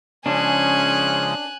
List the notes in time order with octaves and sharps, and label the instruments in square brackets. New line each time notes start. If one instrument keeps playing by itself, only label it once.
[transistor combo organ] C#3 F3 G#3 [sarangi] C#4 [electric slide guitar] D4 [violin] G#5 F#6